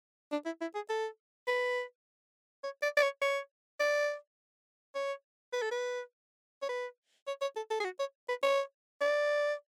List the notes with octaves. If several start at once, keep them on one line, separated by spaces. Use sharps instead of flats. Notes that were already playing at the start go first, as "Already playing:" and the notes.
D4
E4
E4
G#4
A4
B4
C#5
D5
D5
C#5
C#5
D5
C#5
B4
A4
B4
C#5
B4
C#5
C#5
A4
A4
G#4
F#4
C#5
B4
C#5
D5